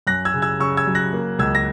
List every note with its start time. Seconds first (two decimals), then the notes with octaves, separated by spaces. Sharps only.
0.07 F#2 F#6 A#6
0.25 E6 G#6
0.34 C#3
0.42 E6 G#6
0.59 C#3 C#6 E6
0.77 E6 G#6
0.87 F#3
0.95 F#6 A#6
1.13 A#3
1.39 C#2 E6 G#6
1.55 A#6